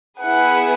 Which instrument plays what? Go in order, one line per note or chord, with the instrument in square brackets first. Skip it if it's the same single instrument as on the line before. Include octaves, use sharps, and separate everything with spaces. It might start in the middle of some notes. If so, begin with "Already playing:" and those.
[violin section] B3 E4 G#4 B4 [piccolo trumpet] F#5